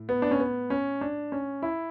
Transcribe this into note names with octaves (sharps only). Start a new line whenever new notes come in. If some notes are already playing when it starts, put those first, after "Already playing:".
Already playing: A2
B3
D4
C#4
B3
C#4
D4
C#4
E4